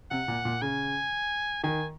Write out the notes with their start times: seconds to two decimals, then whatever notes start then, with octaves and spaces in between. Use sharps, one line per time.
0.11 C3 F#5
0.28 A#2
0.45 A#2
0.62 C#3 G#5
1.63 D#3 G#5